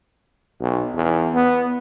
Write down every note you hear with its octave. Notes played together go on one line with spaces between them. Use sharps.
B1
E2
B3